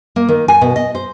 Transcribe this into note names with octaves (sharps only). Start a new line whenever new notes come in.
A#3
D#3
G#5
B2
D#5
C5